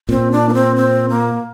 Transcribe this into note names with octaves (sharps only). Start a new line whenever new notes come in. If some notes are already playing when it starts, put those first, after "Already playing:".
A#2 C4
D4
A#3
C4
C4
A#3